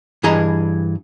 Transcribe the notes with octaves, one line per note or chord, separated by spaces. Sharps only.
G2 E3 G#4 D#5 A#5